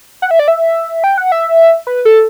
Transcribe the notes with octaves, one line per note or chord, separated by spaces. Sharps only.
F#5
E5
D5
E5
G5
F#5
E5
B4
A4